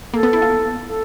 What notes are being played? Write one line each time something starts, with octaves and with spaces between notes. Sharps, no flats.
A#3 A4
B3
E4
F4
A4